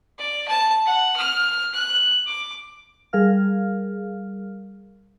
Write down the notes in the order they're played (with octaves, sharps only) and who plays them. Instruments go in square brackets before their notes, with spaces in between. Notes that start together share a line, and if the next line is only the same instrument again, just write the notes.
[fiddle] D5
A5
F#5
F6
F#6
D6
[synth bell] G3 G#4 A#4 F5 F6